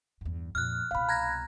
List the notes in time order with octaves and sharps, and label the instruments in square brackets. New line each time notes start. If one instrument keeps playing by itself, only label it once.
[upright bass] E2 G2
[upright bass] F2 A#2 [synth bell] F6 F#6
[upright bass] C2 B2 [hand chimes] F5 B5
[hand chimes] A#5 [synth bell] F#6 G#6 A#6